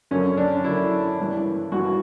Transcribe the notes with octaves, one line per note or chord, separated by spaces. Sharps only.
F#2 D3 C#4
D4
F#2 D3 E4
G2 E3
G2 E3 F#4